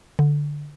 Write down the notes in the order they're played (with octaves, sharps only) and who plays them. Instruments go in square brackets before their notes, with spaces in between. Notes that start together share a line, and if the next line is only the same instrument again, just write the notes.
[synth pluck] D3